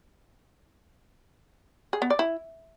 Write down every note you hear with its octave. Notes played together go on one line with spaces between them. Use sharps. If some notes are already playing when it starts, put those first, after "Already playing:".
G#4
B3
D5
E4